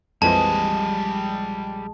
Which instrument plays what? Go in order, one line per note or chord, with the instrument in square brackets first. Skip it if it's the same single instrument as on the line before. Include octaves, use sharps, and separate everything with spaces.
[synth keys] A#1 G#3 [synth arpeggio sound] F2 E3 F3 [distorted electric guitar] G3 D#5 [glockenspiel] A5